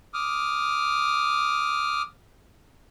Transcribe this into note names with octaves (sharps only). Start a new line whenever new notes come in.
D6 D#6 F6